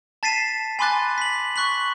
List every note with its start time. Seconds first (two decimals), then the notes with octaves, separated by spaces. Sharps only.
0.23 A5 A6 B6 C7 D#7 E7
0.79 G#5 B5 C6 D6 F#6 A6
1.18 B6 F#7
1.56 C#6 F#6 B6 F#7